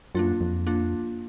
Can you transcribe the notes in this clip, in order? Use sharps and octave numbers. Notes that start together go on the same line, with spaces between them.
F#2 A#3 D4 F4
F2
A#3 D4 F4